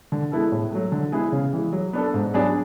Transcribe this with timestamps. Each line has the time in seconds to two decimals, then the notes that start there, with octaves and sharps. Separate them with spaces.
0.12 D3
0.32 G#3 B3 E4 A4
0.52 A2
0.72 F#3 A3
0.92 D3
1.12 G#3 B3 E4 G#4
1.32 C#3
1.53 E3 G#3
1.73 F#3
1.93 B3 D4 A4
2.14 G#2
2.34 F#3 B3 D4 G#4